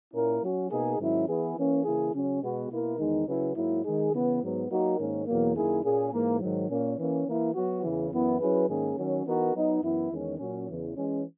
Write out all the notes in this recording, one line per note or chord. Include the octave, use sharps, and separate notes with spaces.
A#2 A#3 C#4 E4 A#4
F#3 C#4 F#4
B2 A#3 D#4 G#4
G#2 D#3 F#3 C#4 E4
E3 B3 E4 G#4
E3 A#3 C#4
C#3 E3 A#3 E4 G#4
C#3 F#3 C#4
B2 G#3 B3 F#4
B2 A#3 E4 A#4
E2 D#3 G#3 D#4
C#3 F#3 C#4 E4 B4
G#2 F#3 A#3 E4
D#3 G#3 D#4 G#4
C#3 E3 B3
G#2 F#3 B3
F#3 A#3 D#4 F#4 A#4
G#2 D#3 A#3 C#4
E2 B2 F#3 A#3
F#2 D#3 A#3 E4 G#4
A#2 A#3 C#4 G#4
G#2 E3 A#3
G#2 D#3 F#3
A#2 A#3 C#4
E3 A#3 C#4
E3 A#3 E4
F#3 B3 F#4
E2 C#3 E3
F#2 E3 B3 E4
F#3 C#4 E4 G#4 B4
G#2 D#3 A#3 C#4 G#4
D#3 F#3 C#4
E3 B3 D#4 F#4 A#4
F#3 B3 D#4
F#2 E3 B3 E4
E2 D#3 G#3 C#4
A#2 F#3 C#4
E2 C#3 E3
E3 G#3 C#4